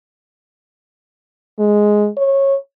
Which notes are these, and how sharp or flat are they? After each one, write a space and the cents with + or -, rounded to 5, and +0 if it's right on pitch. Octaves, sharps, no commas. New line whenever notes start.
G#3 +5
C#5 -20